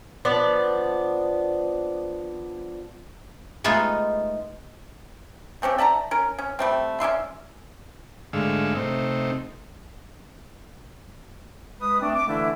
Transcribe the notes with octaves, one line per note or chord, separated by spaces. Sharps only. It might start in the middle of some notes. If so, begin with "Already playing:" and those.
F3 B3 D4 D5
G#3 A3 B3 D#4 F4
A3 C4 C#4 G4
D5 E5 A5 A#5
C#4 A#4
C#4
G3 A3 C4
C#4 D5 E5 C6
G#2 D3 G#3 A3 F5 E6
C3 A3 C4 D#4
G#3 B4 D#6
A3 C4 D4
D6
D3 E3 A3 A#3 D4 E4